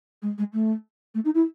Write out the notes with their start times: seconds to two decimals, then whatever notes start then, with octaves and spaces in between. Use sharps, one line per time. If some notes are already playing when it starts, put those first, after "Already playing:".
0.22 G#3
0.38 G#3
0.53 A3
1.14 A3
1.25 D#4
1.35 E4